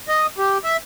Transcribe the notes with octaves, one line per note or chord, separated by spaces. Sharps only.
D#5
G4
E5